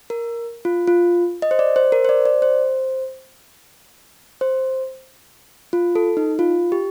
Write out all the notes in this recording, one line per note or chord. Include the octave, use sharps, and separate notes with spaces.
A#4
F4
F4
D#5
C5
D5
C5
A#4
C5
D5
D5
C5
C5
F4
A4
D#4
F4
G4